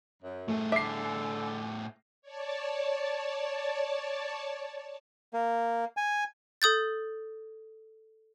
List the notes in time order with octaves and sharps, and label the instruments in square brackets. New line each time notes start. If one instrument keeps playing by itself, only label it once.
[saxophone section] F#2
[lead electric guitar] A2 G#4 [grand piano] A3
[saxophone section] D3 A4 [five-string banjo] E5 [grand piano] D6 C7
[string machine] C#5 D5 A5
[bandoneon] A#3
G#5
[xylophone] A4 D#6 G6 A6